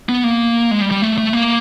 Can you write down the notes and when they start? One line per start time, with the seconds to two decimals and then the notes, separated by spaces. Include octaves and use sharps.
0.09 B3
0.24 A#3
0.71 G#3
0.81 G3
0.91 G3
1.02 A3
1.18 A3
1.33 A#3